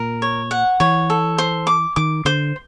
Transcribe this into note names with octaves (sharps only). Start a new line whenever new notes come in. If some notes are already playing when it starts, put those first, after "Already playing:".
Already playing: A#2 A#4
C#5
F#5
E3 C#5
A4
C5
D6
D#3 D6
D3 C5